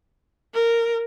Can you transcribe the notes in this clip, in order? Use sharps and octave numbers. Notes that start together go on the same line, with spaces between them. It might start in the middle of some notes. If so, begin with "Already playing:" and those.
A#4